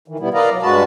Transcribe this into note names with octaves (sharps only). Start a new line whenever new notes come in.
D#3 E3
B2 G3 B3 E4
A#4 B4 D5 D#5 F5 A#5
F#3
G2 G#3 F#4 B4 A5